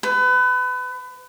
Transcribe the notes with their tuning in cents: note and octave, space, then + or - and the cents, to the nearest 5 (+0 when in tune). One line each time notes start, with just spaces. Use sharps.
B4 +30